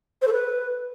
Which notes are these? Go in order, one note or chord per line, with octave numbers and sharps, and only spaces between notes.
C5
A4
B4